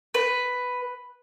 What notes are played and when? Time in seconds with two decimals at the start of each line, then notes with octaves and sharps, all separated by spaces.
0.14 B4